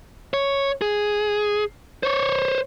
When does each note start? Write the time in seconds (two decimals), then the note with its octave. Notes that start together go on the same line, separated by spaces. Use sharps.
0.34 C#5
0.82 G#4
2.03 C5 C#5